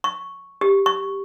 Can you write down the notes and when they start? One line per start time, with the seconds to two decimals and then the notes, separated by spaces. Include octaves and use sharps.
0.04 C#6
0.61 G4
0.86 C#6